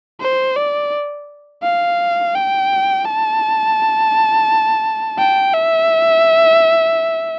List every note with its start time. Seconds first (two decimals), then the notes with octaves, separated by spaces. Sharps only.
0.21 C5
0.56 D5
1.63 F5
2.35 G5
3.05 A5
5.19 G5
5.54 E5